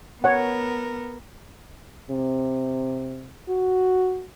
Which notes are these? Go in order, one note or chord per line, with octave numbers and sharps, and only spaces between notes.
B3 A#4 C#5 F#5
C3
F#4